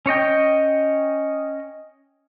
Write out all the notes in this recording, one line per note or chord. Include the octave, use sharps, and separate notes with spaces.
C#4 C#5 D#5 G5